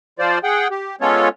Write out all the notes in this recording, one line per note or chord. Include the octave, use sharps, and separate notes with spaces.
F3 F4 C5 D5
G#4 F#5 G5
G4
G#3 B3 C#4 F4 A4 C#5